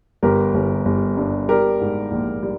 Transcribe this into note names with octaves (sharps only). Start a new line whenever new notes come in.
G1 G4 A#4
G1
G1
G2
G3 G4 A#4
G#2
A#1
G3